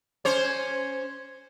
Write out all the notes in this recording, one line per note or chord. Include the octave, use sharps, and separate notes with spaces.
C#4 C5 C#5